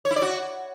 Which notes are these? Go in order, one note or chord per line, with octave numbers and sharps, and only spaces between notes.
C#5
E4
D5
F#4